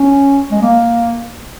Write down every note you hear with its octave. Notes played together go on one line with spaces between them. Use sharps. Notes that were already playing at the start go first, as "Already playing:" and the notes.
Already playing: C#4
G#3
A#3